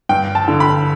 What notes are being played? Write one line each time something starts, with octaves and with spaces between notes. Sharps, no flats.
G2 G5
A5
D3
B5